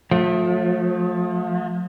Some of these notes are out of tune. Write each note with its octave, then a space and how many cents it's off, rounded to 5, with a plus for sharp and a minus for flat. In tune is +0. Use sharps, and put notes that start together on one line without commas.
F3 +40 A3 +0